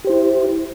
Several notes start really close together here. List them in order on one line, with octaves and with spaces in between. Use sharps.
G4 C5 E4